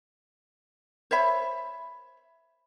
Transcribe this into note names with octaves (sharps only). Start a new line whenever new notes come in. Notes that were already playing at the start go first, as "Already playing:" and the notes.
C5 C#5 E5 B5